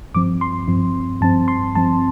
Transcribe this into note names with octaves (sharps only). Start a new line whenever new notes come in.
G2 F3 C4 D6
C6
G2 F3 C4
G2 F3 C4 A5
C6
G2 F3 C4 A5